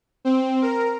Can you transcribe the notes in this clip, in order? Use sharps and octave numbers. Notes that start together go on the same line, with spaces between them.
C4
A#4